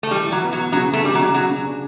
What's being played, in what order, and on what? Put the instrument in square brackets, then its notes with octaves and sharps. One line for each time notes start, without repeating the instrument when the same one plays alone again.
[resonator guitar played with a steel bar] A3
[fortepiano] E3 [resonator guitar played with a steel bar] G3
[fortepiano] E3
[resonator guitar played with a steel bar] F#3
[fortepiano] B3
[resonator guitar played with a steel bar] F#3
[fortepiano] B3
[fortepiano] C#3 [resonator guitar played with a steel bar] F#3
[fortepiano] C#3
[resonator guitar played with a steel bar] A3
[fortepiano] C#3 [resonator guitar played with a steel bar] G3
[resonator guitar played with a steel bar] F#3
[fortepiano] C#3
[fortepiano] C#3 [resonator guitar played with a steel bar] F#3
[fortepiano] C#3
D4